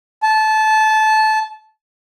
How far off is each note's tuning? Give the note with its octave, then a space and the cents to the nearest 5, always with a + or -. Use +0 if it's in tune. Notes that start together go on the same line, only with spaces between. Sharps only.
A5 -20